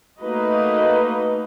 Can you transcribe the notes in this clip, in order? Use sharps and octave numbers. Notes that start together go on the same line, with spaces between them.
A3 A#3 D#4 F#4 B4 D#5